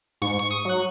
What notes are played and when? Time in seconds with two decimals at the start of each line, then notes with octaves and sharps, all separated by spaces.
0.22 G#2 C#6
0.39 C#6
0.51 D#6
0.65 F#3 F#6